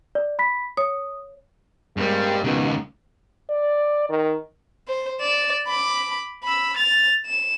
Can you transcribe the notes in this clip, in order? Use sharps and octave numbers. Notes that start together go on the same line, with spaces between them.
D5
B5 B6
C#5 D#6
G2 G3 G#3 A#3 C4
C#2 B2 D#3
D5
D#3
C5
D5 E7
B5 D6
B5 E6
A6 F7
E7